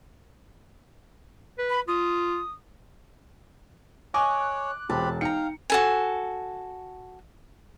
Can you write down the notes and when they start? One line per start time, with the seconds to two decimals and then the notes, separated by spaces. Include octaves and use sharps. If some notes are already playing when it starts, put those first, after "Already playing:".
1.58 B4
1.70 B5
1.88 F4 D#6
4.14 C#5 D#5 G#5 C#6 D6 F#6
4.90 E1 C4 G4 A5 B5
5.21 D#4 F5 G5 A#5 C#7
5.70 F#4 A4 G#5